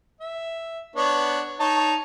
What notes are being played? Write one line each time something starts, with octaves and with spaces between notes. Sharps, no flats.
E5
B3 D4 C#5
D#4 C#5 A5